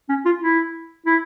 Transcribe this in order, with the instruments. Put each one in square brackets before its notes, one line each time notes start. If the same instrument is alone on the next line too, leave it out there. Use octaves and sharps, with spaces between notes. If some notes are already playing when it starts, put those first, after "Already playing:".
[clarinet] C#4
F4
E4
E4